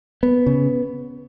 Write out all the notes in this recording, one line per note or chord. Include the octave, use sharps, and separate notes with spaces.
B3
C#3